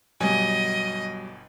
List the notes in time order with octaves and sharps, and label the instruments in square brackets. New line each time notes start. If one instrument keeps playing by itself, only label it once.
[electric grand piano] G1 B2 G#5 [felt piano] F#3 G3 [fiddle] D#5